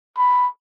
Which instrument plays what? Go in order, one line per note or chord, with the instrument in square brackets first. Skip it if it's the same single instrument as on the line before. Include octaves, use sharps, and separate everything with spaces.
[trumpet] B5